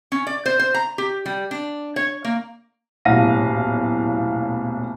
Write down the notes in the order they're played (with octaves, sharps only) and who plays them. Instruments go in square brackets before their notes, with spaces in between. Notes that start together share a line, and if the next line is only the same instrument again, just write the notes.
[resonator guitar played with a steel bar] C#4
D5
C5
C5
A#5
G4
G3
D4
C#5
A#3
[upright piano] D#1 B1 A2 F5 A#6 D#7